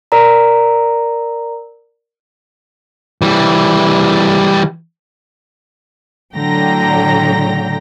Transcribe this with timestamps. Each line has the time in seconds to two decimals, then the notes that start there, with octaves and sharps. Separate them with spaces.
0.12 A#4 D5 A#5
3.22 E3 G3
6.35 A2 D3 F#3 G5 A#5 A#6